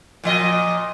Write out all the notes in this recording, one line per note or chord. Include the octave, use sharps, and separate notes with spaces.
A#2 F3 D#5